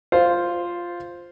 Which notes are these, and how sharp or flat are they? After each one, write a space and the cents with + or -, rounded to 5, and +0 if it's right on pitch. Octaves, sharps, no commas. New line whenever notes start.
F4 +0 C5 +0